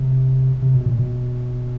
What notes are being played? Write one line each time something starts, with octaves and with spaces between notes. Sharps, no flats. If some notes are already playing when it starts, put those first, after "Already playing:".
Already playing: C3
C3
B2
A#2
B2